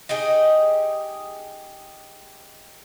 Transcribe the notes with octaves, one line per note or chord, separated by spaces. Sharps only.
D#4 G4 G#4 D#5